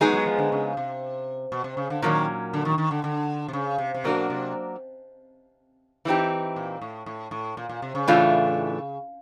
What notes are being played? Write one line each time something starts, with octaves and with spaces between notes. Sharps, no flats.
F#3 G#3 B3 D#4 G#4
F#3
F3
D3
C#3
C3
B2
C3
C#3
D3
A#2 D#3 F#3 A#3 C#4
D3
D#3
D#3
D3
D3
C3
C#3
C3
C3
B2 F#3 A#3 D4 F#4 A#4
C3
E3 G3 C4 D#4 G4
A#2
A2
A2
A2
A#2
A#2
C3
C#3
A2 E3 A3 D4 F4